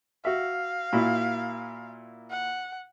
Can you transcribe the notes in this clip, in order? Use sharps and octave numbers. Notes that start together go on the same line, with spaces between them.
F#4 E5 F5
A#2 E4 F#4
F#5